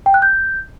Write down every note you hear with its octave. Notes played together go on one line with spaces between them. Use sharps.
G5
F#6
G6